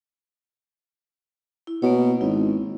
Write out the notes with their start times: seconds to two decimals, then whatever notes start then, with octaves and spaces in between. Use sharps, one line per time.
1.67 E4
1.82 B2 A#3 C#5
2.21 G#1 E4